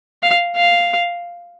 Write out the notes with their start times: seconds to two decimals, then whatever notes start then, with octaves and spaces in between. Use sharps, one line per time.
0.23 F5
0.56 F5